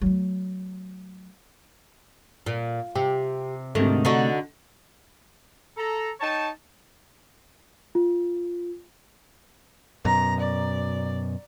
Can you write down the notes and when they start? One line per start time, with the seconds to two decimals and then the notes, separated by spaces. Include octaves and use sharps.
0.02 F#3 A3
2.46 A#2
2.95 C3 G4
3.75 D2 G#2 C3 D#3 A3
4.05 D3 D#4 F#4
5.77 A4 A#5
6.21 D#4 C#5 G5 A5
7.95 F4
10.05 F#2 B2 A#5
10.41 D5